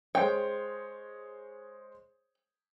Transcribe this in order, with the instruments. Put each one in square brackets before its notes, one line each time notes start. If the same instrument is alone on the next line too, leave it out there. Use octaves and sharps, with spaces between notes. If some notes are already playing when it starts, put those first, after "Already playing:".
[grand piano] G#3 C5 C#5 [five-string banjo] G5